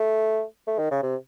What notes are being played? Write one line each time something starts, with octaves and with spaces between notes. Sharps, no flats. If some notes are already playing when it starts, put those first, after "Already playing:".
Already playing: A3
A3
D#3
C#3
C3